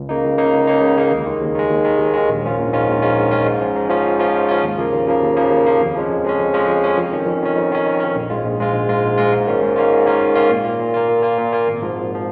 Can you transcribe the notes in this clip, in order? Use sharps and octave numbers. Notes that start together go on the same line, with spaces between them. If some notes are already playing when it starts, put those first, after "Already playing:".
Already playing: C#2
C#3 A#3 D#4
C#2
C#3 A#3 D#4
C#2
C#3 A#3 D#4
C#2
C#3 A#3 D#4
D#2
D#3 G#3
D#2
D#3 G#3
D#2
D#3 G#3
D#2
D#3 G#3
A#1
G#2 D#3 C#4 F4
A#1
G#2 D#3 C#4 F4
A#1
G#2 D#3 C#4 F4
A#1
G#2 D#3 C#4 F4
G#2
F3 C#4 F4
G#2
F3 C#4 F4
G#2
F3 C#4 F4
G#2
F3 C#4 F4
D#2
C#3 F3 A#3
D#2
C#3 F3 A#3
D#2
C#3 F3 A#3
D#2
C#3 F3 A#3
F2
F3 G#3 C#4
F2
F3 G#3 C#4
F2
F3 G#3 C#4
F2
F3 G#3 C#4
F2
D#3 C#4
F2
D#3 C#4
F2
D#3 C#4
F2
D#3 C#4
A#1
G#2 G#3 F4
A#1
G#2 G#3 F4
A#1
G#2 G#3 F4
A#1
G#2 G#3 F4
G#2
D#3 A#3 C#4 F4
G#2
D#3 A#3 C#4 F4
G#2
D#3 A#3 C#4 F4
G#2
D#3 A#3 C#4 F4
A#2
A#3 F4
A#2
A#3 F4
A#2
A#3 F4
A#2
A#3 F4
G#1
G#2 F3
G#1
F3